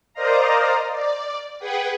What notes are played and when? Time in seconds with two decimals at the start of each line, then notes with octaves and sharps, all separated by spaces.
0.14 A#4 C5 D5 D#5 F5 A#5
0.92 D5
1.59 G#4 B4 F#5 G5